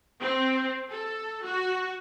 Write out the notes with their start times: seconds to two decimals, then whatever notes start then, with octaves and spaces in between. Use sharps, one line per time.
0.21 C4
0.90 A4
1.44 F#4